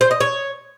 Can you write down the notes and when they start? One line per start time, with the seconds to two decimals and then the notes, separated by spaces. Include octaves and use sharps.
0.01 C5
0.11 D#5
0.20 C#5